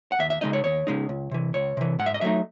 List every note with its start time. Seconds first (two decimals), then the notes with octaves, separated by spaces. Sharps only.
0.12 F#5
0.19 D#2 E5
0.30 E5
0.41 C#3 G#3 D#4 D#5
0.53 C#5
0.64 D#2 C#5
0.87 C#3 G#3 D#4
1.09 C#2
1.31 C3 E3
1.54 C#2 C#5
1.77 C3 E3
1.99 G#2 F#5
2.06 E5
2.14 D#5
2.21 F#3 A3 D#4 E5